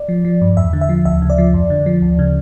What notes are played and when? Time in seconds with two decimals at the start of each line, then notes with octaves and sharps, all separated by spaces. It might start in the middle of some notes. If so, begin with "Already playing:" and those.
Already playing: D5
0.09 F3
0.25 F3
0.41 G2
0.57 E2 E5
0.73 D3
0.81 E5
0.89 F3
1.05 D2 E5
1.22 C#3
1.30 D5
1.38 F3
1.54 F2
1.70 D3
1.86 F3
2.02 D2
2.19 C#3